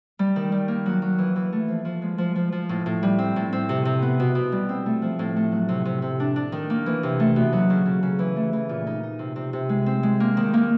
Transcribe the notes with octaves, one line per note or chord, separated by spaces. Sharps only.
G3
D#3
G3
A#3
F#3
F#3
E3
E3
A3
F3
F3
G#3
F3
F3
F3
A2
A2
G3
C4
A2
C4
C3
C3
B3
B2
B2
G3
C4
A3
F3
A2
A3
F#3
C3
C3
C3
D4
D4
D#3
A#3
E3
C3
A3
B2
F#3
C#3
C#3
C#3
E3
A3
E3
A#2
D#4
D#4
C3
C3
C3
G#3
C4
G#3
A#3
D#3
A#3